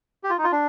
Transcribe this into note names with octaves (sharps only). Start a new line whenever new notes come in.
G4
F4
D#4
F4
D4